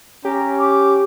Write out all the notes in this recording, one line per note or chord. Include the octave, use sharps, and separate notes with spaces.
C#4 G4 A#5
D6